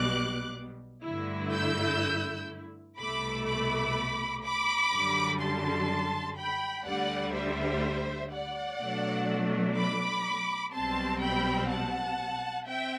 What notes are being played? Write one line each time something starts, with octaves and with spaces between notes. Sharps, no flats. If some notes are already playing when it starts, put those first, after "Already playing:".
Already playing: B1 B2 G3 B3 D6 F#6
G2 D3 A3 E4
E6 G6
C2 B2 A3 B5 D6
B5 D6
B5 D6
F#2 D3 G3
A5 C6
G5 B5
D2 D3 G3 D5 F#5
C5 E5
D5 F#5
B2 F#3 A3 D4
B5 D6
B1 B2 G3 C4 A5 C6
G5 B5
F#5 A5
C4 E5 G5